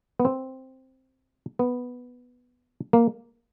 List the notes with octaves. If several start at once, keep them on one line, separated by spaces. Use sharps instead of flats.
B3
C4
B3
A#3